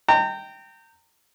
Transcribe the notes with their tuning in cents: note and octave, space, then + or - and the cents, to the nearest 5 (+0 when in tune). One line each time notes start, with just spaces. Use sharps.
G5 -10 A#5 -35